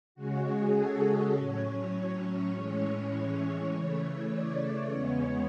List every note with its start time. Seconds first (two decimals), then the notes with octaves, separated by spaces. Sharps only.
0.15 C#3 G#3 C#4 F#4
0.45 G#4
0.75 A4
1.35 A2 F#3 C#4 C#5
1.93 C#5
2.53 A2 E3 G#3 C#4
3.72 C#3 E3 A3 C#5
4.02 C#5
4.31 D5
4.91 E2 C#3 G#3 B3 C#5